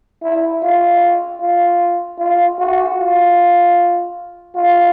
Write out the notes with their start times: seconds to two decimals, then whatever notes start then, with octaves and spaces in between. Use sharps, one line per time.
0.22 E4
0.63 F4
1.41 F4
2.19 F4
2.59 F#4
2.99 F4
4.56 F4